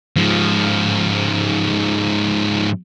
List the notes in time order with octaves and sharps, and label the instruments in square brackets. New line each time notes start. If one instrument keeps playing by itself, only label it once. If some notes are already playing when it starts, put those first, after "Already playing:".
[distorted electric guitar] G#2 F3